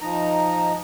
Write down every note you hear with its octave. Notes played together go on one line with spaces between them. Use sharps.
F3 D#4 A#5